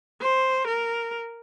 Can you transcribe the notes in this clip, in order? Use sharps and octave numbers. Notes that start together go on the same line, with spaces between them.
C5
A#4